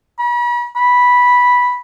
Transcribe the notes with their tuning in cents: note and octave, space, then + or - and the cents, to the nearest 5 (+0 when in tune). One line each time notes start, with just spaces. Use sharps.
B5 -40
B5 -5